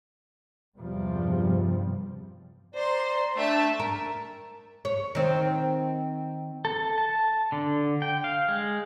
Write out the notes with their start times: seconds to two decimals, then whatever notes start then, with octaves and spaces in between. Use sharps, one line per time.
0.77 E2 G2 C3 F3 G3
2.75 C5 D5 A#5 C6
3.38 A3 D4 D5 E5 G5 A5
3.80 A#4
4.85 C#5
5.15 D#3 C4
6.65 A4
6.98 A5
7.52 D3
8.02 G5
8.24 F5
8.48 G#3